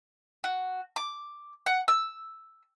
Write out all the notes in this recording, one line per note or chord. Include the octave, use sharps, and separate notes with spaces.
F#4
D6
F#5
E6